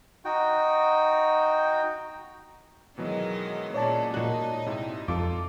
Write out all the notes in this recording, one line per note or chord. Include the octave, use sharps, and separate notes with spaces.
D#4 F#4 G5
B2 D#3 E3 F#3 G#3 D#4
A#2 G#3 C#4 C#5 D5 A5
A#2 D#4 F#4
G#2 C3 E4
F2 F4 A4 D6